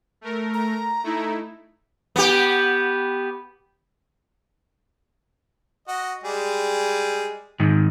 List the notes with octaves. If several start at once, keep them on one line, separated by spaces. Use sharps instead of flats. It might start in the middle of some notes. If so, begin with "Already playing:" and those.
A3 A#4
A#5
A3 D#4 E4
B3 G4
F#4 D#5
G3 G#3 G#4
G#2 D#3